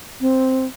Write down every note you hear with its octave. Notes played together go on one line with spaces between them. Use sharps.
C4